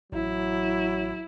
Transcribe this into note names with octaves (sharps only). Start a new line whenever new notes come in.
A1 F#3 E4